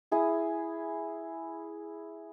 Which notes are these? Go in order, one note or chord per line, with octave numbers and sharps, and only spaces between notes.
E4 G#4 D#6